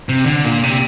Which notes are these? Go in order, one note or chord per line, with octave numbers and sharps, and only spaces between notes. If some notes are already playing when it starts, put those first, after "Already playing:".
C3
D3
A#2
C3